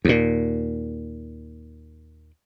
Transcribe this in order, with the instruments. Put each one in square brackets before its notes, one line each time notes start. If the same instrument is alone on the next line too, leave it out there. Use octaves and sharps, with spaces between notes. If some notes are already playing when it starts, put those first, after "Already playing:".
[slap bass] D#2 A#2